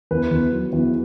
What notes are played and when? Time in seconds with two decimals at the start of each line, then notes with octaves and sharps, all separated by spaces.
0.11 E2 B4
0.31 E2
0.52 F#3
0.73 E2